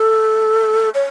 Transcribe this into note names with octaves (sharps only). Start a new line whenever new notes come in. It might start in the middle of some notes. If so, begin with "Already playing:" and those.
Already playing: A4
C#5